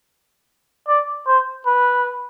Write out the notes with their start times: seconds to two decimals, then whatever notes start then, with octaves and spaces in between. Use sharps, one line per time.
0.88 D5
1.27 C5
1.66 B4